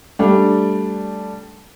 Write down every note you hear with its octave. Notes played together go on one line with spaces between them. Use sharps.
G3 A3 D4